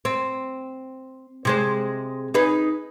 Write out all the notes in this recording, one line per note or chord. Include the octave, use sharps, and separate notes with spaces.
C4
C3 G#3 C5
D#4 G#4 B4